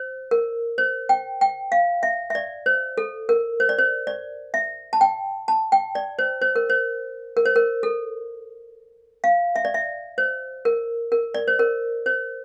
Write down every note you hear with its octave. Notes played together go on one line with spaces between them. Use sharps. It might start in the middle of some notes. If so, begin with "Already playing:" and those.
Already playing: C5
A#4
C5
G5
G5
F5
E5
E5
D5
C5
A4
A#4
C5
D5
C5
D5
E5
A5
G5
A5
G5
D5
C5
C5
A#4
C5
A#4
C5
A#4
A4
F5
E5
D5
E5
C5
A#4
A#4
D5
C5
A#4
C5